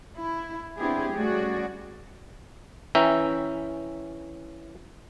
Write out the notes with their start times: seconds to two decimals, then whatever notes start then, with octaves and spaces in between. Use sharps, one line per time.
0.17 E4
0.77 B3 C4 D4 E4 G4 G#4
1.14 G3 A3 C#4 F#4 G#4 D5
2.95 E3 C#4 E5 G5 A#5